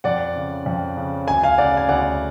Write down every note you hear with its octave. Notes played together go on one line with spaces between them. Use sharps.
F2 D5 F#5
C#3
F2
C#3
D2 G#5
F5 G#5
C#3 D5 F#5
G#5
D2 D5 F#5